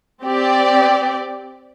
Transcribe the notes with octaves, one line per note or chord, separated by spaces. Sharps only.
C4 G4 D5